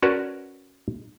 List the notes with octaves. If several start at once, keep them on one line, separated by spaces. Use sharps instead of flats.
C#4 F#4 A#4 B4 D5 A5